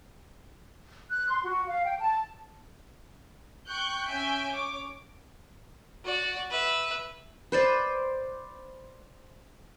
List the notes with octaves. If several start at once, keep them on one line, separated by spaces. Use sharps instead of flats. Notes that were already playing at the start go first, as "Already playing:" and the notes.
F#6
C6
F#4
F5
G5
A5
G5 C#6 F#6 G6
C#4 E5 G#5 G6 D7
C#5 D6
F#4 D5
B4 E5
B4 C5 D5